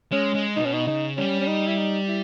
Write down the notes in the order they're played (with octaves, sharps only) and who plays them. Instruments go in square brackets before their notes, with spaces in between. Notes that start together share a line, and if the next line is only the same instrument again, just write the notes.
[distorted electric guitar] G#3 [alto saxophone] C#4
[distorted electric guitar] G#3
[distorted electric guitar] B2 [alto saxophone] D#4
[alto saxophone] C#4
D#4
[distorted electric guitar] C#3 [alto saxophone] D#4
[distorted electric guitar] G3 [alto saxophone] C#4
[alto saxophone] C#4
D#4
E4
D#4
E4